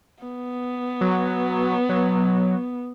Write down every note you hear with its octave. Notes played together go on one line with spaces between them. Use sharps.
B3
F#3
F#3